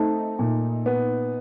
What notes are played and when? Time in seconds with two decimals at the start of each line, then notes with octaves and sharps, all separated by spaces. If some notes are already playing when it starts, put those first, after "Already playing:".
Already playing: A3 C4 D#4
0.39 A#2
0.86 B3